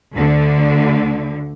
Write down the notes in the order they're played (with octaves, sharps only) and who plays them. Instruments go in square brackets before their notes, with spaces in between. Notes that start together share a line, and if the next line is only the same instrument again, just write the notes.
[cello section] D2 D3